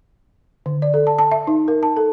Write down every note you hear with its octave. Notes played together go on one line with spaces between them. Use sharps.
D3
D5
A4
A5
A5
E5
D#4
A#4
A5
A4